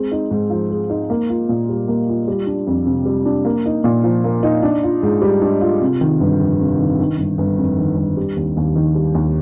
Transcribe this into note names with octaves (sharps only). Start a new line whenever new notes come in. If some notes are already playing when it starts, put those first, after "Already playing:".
Already playing: G#3 C4
D#4
G#2
F3
G#3
D#4
A#3
F4
A#2
G3
A#3
F4
G3
D4
F2
C3
G3
D4
A#3
D#4
A#2
F3
A#3
D#4
D4
F4
G#2
G3
D4
F4
C3
D#3
G1
F2
C3
D#3
D#3
G1
G1
F2
D#3
G1
G3
D#2
D#2
D#3
G3
D#2